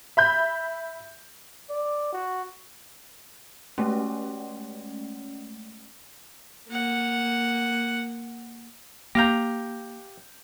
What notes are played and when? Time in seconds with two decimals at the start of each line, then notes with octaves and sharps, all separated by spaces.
0.17 E5 B5 G6
1.70 D5
2.13 F#4
3.78 G#3 A3 C#4
6.69 A#3 F#5
9.15 A#3 G4 F5 A#5 G6 A#6